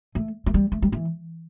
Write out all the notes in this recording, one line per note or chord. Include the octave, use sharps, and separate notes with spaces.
A3
A3
G3
A3
G3
E3